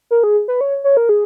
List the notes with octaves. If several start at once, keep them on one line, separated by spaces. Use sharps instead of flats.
A#4
G#4
B4
C#5
C#5
A#4
G#4